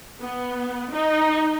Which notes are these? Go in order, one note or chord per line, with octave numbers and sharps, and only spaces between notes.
B3
D#4